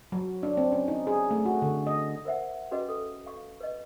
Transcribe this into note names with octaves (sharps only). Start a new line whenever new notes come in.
F#3
D4
C4
C#4
D#4
G#4
A3
F#4
D3
D#5
A#4 C5 E5 F#5
C#4 F#4 G#4 B4 D#5
A4
F5 C#6
B4 D#5